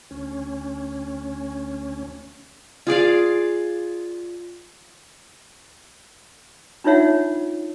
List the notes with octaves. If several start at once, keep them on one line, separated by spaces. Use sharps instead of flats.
D2 C#4
F4 G#4 D5 F5
D4 D#4 F4 C#5 E5 F#5